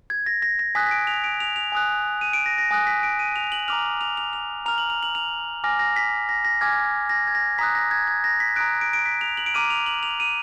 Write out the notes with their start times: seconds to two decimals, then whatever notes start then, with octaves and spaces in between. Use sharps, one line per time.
0.10 G#6
0.26 A#6
0.42 A#6
0.59 A#6
0.75 G#5 D#6 F#6 B6
0.86 B6
0.91 D7
1.07 F7
1.24 D7
1.40 F7
1.56 F7
1.72 G#5 D#6 F#6
2.21 D#7
2.33 D7
2.46 A#6
2.58 A#6
2.71 G#5 D#6 F#6
2.87 B6
3.03 D7
3.19 D#7
3.36 F7
3.52 F#7
3.68 A#5 D6 F6 F7
4.01 F7
4.17 F7
4.33 F7
4.66 A#5 F6 F7
4.78 F#7
4.90 F7
5.03 F#7
5.15 F7
5.64 G#5 D6 F6 A#6
5.79 A#6
5.96 B6
6.29 A#6
6.45 A#6
6.61 G#5 D6 F6 G#6
7.09 A#6
7.27 G#6
7.35 A#6
7.58 A#5 D#6 F#6 B6
7.75 A#6
7.91 G#6
8.07 G#6
8.24 A#6
8.40 B6
8.56 A#5 D#6 F#6 D7
8.81 D7
8.93 D7
9.06 B6
9.21 F7
9.37 F#7
9.46 D7
9.54 A#5 D6 F6 D#7
9.70 F7
9.86 F#7
10.03 F7
10.20 D#7